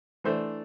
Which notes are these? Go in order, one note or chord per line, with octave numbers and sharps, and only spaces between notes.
E3 A3 D4 C5